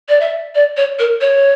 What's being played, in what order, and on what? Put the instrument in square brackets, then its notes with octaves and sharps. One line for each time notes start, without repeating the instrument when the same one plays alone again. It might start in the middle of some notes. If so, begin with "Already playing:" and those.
[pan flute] D5
E5
D5
C#5
A#4
C#5